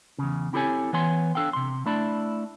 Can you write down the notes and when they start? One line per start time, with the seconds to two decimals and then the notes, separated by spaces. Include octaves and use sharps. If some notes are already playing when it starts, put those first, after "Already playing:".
0.18 E2 C#3
0.53 C4 E4 G4 A4 C#5 G#5
0.93 E3 B3 C#5 G#5 C6
1.35 D4 A4 F5 G5
1.53 C3 C6
1.86 A3 D4 E4 D5 A5 B5